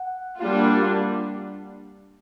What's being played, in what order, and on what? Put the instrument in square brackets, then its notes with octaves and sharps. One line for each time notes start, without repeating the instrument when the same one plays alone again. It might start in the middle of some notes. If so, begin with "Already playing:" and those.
Already playing: [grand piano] F#5
[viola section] G3 A#3 D4 F4